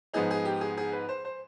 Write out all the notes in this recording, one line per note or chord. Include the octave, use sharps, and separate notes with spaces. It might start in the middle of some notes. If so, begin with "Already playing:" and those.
G#2 F3 B3 D#4 G#4
G#4
G4
G#4
G#4
B4
C5
C5